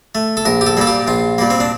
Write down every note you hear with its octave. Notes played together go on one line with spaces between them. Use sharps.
A3
A4
A#1 A#4
G4
A4
A#2 G3 A#3 A4
G4
A#1 F4
A#2 G3 A#3
C4
D4